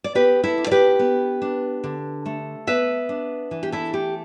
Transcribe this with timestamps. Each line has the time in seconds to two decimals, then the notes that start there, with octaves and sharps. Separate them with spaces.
0.04 D5
0.15 B3 G4 B4
0.44 E4 A4
0.58 D4
0.67 D5
0.71 G4 B4
0.99 B3
1.42 D4
1.84 D3
2.26 A3
2.67 B3 B4 E5
3.09 D4
3.51 E3
3.63 G4
3.72 E4 A4
3.93 A3 G4